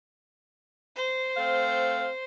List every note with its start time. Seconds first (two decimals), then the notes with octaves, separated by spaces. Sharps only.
0.96 C5
1.37 A3 C4 F5